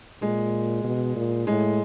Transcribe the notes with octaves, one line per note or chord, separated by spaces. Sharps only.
A#2 G#3
B2
A#2
A2 G#3